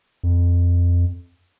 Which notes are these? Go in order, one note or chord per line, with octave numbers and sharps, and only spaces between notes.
F2